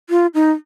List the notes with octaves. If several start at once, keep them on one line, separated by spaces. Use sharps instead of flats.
F4
D#4